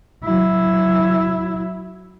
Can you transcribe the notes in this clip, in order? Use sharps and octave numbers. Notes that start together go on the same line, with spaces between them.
F#3 E4